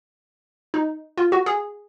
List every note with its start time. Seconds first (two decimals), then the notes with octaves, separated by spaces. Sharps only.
0.74 D#4
1.17 F4
1.32 F#4
1.46 G#4